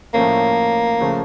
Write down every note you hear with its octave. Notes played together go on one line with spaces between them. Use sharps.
A2 F3 A3 A#3 C#4
C#3 F3 A3